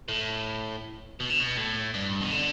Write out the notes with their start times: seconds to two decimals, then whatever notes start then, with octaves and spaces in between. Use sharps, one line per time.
0.09 A2
1.20 B2
1.30 D3
1.40 B2
1.57 A2
1.94 G2
2.21 B2
2.31 D3